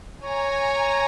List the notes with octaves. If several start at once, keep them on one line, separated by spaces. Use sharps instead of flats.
C#5 G#5 A#5